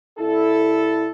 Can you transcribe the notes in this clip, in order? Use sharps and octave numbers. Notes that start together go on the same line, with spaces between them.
C2 E4 A4